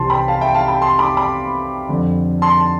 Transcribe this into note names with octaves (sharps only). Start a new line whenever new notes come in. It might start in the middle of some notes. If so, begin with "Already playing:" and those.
Already playing: C2 C3 E3 A5 C6
G5 B5
F5 A5
E5 G5
F5 A5
G5 B5
A5 C6
B5 D6
B5 D6
F2 D3
A5 C6
A5